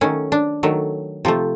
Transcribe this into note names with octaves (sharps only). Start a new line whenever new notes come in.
D#3 F#3 A3 C#4
D4
D#3 F#3 A3
C3 F3 A3